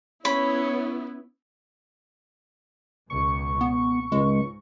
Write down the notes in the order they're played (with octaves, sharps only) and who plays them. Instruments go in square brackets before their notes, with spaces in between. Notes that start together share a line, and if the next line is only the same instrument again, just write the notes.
[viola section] B3 E4 [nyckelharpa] C#4 [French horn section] C#5 [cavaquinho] B5
[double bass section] C#2 B2 [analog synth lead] C#6
[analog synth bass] B3
[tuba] C#2 [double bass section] G#2 [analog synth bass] G#3